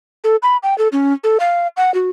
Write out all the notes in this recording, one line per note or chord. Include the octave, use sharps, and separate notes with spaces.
A4
B5
G5
A4
C#4
A4
F5
F#5
F#4